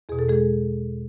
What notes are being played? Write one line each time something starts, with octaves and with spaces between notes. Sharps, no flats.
E2 B2 G#4
A4
G#3 G#4